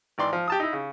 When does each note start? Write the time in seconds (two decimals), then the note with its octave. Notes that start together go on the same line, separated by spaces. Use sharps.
0.18 G#1 E3 D5 C6
0.33 F3
0.48 G4 A5 D#6
0.60 D#4 E4
0.73 C#3